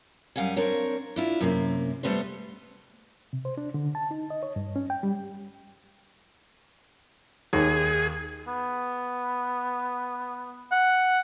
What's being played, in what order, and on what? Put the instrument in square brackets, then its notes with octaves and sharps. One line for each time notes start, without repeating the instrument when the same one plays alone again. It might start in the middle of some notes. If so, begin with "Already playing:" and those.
[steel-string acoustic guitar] F#2 G3 F5 F#5 G#5
C4 D4 A#4 C#5
D4 E4 F4
F#2 C3 A#3
G3 A3 B3 G4 C5
[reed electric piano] C3
C5
D4
D3
A5
D#4
D#5
C#5
G2
C#4
G5
G3
[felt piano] D#2 [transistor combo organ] G#4
[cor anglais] B3
[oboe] F#5